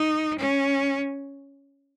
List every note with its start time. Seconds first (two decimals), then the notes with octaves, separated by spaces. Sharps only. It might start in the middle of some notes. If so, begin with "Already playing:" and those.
Already playing: D#4
0.39 C#4